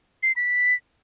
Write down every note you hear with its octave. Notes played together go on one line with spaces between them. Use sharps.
C7
B6